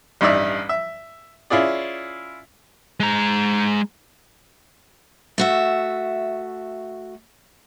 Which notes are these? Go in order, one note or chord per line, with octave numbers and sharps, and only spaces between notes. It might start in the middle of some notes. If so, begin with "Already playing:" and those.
A1 G2 D#4 D5 E5
E5
C#4 E4 F4 G#4 D5
G#3 A#5
A3 F#4 E5